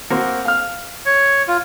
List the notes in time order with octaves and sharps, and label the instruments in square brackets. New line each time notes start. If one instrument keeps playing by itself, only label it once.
[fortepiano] A#3 C4 F#4
F5 F6
[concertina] C#5
F4